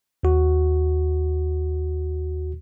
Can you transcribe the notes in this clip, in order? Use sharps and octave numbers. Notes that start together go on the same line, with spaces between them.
D#2 F#4